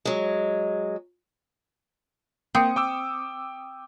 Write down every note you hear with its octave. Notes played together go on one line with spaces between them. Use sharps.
F#3 G#3
A#3 C4 D#6 C#7
G5 D6 E6